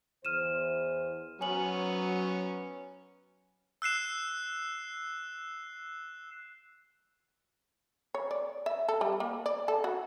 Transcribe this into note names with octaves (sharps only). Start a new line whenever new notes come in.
E2 C5 F6 D#7 E7
F#3 B3 C#4 G#5 F#7
E6 F#6 C7 E7
C#5
D5
E5
A4
G3
A#3
D5
A4
F#4